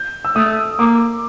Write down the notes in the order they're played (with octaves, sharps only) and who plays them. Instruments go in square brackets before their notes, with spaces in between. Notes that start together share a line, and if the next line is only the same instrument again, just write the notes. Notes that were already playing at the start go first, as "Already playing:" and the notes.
Already playing: [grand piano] G6
E6
[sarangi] A3 [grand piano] D#6
[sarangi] A#3 [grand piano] D6